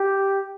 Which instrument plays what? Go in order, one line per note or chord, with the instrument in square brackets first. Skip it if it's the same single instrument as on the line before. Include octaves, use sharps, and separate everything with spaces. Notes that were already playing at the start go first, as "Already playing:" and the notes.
Already playing: [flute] G4